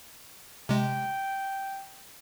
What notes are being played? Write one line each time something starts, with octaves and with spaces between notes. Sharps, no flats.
C3 G#3 G5